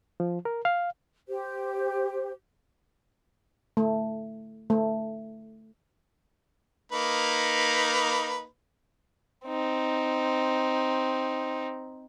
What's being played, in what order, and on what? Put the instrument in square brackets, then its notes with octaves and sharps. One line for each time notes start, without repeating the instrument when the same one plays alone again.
[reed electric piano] F3
A#4
F5
[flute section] G4 C5
[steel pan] A3
A3
[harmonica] A#3 D#4 B4
[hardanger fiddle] C4 D#4